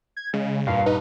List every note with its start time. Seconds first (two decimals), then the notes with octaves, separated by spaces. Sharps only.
0.17 G#6
0.33 C#3 G#3
0.67 D#1 G2 A#2 F5
0.86 D#4 B4